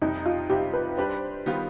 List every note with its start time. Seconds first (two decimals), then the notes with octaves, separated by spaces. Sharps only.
0.02 F2 C3 G3 D#4
0.26 F4
0.49 C3 G3 C4 G4
0.74 B4
0.97 G3 D4 G4 B4 C5
1.46 D#3 G3 B3 F4